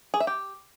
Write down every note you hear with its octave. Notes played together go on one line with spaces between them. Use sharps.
G#4
E5
G4